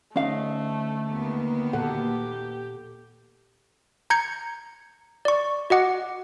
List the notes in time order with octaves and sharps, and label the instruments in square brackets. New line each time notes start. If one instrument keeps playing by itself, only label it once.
[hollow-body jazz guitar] D2 F5 [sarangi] A3 [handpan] C#4 D#5
[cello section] D#2 A#3 B3
[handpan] A#2 A4 F#5 [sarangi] G4
[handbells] A#5 G6 G#6 C#7
D5 C#6
F#4 D#5 F#5 D6